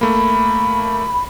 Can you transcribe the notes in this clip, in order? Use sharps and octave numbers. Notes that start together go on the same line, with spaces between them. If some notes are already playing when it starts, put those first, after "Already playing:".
A3 A#3 B5